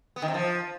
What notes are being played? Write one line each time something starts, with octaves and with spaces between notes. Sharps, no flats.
B3
D#3
C3
F3